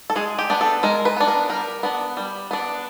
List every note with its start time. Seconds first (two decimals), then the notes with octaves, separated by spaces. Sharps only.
0.10 A4
0.16 G#3 G#4
0.39 G4
0.50 B3 D4
0.61 A4
0.83 G#3 A#4
1.05 B4
1.16 B3 D4
1.28 A#4
1.49 G3 A#4
1.83 B3 D4
2.17 G3
2.51 B3 D4